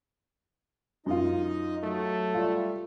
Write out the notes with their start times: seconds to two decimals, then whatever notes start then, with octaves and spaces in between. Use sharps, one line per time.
1.06 F#2 D#4 F4 D#5
1.83 F#3 A3
2.34 G3 F4